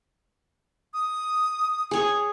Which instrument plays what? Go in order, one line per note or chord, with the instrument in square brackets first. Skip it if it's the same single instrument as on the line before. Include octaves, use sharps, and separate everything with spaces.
[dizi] D#6
[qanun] G#4 C#5 C#6